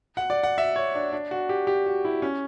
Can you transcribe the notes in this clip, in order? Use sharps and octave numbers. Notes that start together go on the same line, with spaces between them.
F#5
D5
F#5
E5
C#5
D4
D4
F#4
G4
G4
F#4
E4
C#4